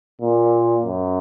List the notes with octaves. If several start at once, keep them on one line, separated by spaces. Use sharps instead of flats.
A#2
F#2